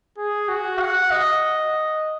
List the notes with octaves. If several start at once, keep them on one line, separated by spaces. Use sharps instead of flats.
G#4
F#4
F#5
D#5